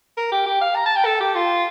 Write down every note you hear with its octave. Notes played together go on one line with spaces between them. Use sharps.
A#4
G4
G4
F5
A#5
A5
G5
A4
G4
F4